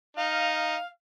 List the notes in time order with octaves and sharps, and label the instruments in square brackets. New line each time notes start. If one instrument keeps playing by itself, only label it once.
[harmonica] D#4 [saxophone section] F5